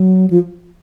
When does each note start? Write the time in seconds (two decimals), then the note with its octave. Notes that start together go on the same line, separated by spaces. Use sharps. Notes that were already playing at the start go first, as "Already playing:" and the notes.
Already playing: F#3
0.30 F3